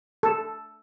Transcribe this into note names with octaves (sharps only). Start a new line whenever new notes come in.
A4